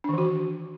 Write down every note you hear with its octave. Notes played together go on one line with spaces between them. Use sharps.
D#3 E3 D4 F#4